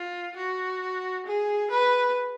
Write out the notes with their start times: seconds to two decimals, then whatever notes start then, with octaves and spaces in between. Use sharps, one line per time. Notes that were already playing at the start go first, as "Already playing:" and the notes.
Already playing: F4
0.36 F#4
1.26 G#4
1.71 B4